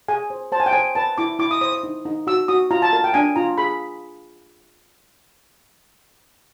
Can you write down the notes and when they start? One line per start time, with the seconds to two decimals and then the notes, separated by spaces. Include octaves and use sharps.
0.08 G#4 G#5
0.30 C5
0.52 C5 A5
0.60 G#5
0.66 G5
0.73 C5 G#5
0.95 B4 A5
1.18 E4 D6
1.39 E4 D6
1.51 D#6
1.61 C5 D#6
1.72 D#6
1.83 D#4
2.05 D#4
2.27 F#4 E6
2.48 F#4 D#6
2.71 F4 A#5
2.82 A5
2.93 A#4 A5
3.04 G5
3.14 D4 G#5
3.36 F4 A#5
3.58 G#4 B5